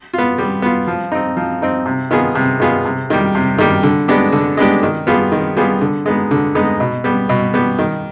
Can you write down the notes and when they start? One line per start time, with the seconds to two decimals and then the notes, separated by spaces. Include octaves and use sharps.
0.13 B3 F4
0.38 G3
0.62 B3 F4
0.87 F3
1.12 C4 D#4
1.37 F3
1.62 C4 D#4
1.86 C3
2.11 D#3 B3 F4 G#4
2.35 C3
2.60 D#3 B3 F4 G#4
2.85 C3
3.10 D#3 G3
3.35 C3
3.58 D#3 G3
3.83 D3
4.08 G#3 B3 D4 G4
4.32 D3
4.57 G#3 B3 D4 G4
4.83 D#3
5.07 G3 B3 F4 G#4
5.32 D#3
5.57 G3 B3 F4 G#4
5.81 D3
6.06 G#3 B3 D#4
6.31 D3
6.55 G#3 B3 D#4
6.80 B2
7.04 G3 B3
7.29 B2
7.54 G3 B3
7.79 D#3